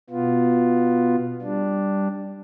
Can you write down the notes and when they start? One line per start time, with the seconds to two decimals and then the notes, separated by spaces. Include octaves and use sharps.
0.10 B2 B3 F4
1.42 G3 D4